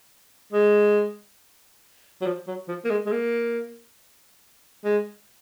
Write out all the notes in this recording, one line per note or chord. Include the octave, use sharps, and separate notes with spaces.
G#3
F#3
F3
F#3
F3
A#3
G#3
G#3
A#3
G#3